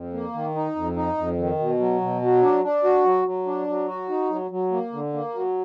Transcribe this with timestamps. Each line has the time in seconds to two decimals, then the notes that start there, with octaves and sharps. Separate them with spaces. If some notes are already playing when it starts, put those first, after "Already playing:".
Already playing: F2
0.13 A#3
0.34 D#3
0.55 D#4
0.76 F2
0.96 D#4
1.17 F2
1.38 D#3
1.59 B2
1.79 F#3
2.01 B2
2.22 F#3
2.42 D4
2.63 D4
2.84 F#4
3.05 F#3
3.26 F#3
3.46 D4
3.67 F#3
3.88 F#4
4.09 D#4
4.30 F#3
4.51 F#3
4.72 A#3
4.93 D3
5.13 A#3
5.34 F#3